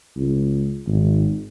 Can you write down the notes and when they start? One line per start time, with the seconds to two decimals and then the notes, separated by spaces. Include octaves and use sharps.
0.17 C#2
0.87 G#1